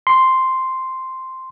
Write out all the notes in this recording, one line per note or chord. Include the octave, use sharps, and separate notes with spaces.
C6